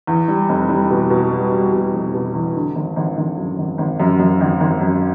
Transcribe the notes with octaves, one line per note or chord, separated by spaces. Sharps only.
E2
G3
F1
G3
B2
B2
G3
G3
B2
F1
B2
E2
D3
G#1
G#1
G#1
F#2
G#1
G#1
F#2
F#2
G#1
G#1
F#2